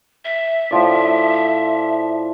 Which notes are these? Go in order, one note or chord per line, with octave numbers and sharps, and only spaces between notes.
E5
A2 F3 D5